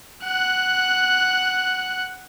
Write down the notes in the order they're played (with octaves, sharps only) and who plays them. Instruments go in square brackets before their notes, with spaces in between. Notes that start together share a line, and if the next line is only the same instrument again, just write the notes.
[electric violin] F#5 F#6